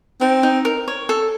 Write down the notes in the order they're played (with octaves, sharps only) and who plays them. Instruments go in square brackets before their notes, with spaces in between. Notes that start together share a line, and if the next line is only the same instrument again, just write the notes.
[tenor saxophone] C4 [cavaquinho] D#4
[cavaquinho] D#4
A#4
C#5
A4